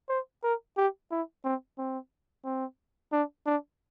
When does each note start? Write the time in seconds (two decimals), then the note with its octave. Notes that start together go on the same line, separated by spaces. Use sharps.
0.10 C5
0.44 A#4
0.77 G4
1.11 E4
1.45 C4
1.78 C4
2.45 C4
3.12 D4
3.46 D4